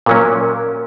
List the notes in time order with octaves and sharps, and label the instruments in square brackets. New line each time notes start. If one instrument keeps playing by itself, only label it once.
[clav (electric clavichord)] A#2 F#3 C#4 [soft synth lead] A#4